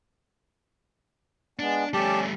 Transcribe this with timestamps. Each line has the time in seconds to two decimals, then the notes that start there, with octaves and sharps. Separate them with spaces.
1.59 G#3 B3 D4
1.94 G3 A3 C#4 G4 D5 A5